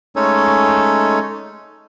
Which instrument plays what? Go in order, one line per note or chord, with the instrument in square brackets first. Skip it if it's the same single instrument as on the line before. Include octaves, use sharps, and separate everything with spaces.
[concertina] G#3 A3 C#4 D#4 A4 C#5